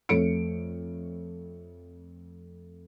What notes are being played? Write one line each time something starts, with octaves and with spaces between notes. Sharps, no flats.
F2 A3 A4 C#5 C#7 D7